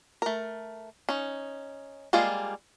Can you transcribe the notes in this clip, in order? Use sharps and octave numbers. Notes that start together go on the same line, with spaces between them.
A3 A#4
C#4 D#4
G3 G#3 A#3 F4 G#4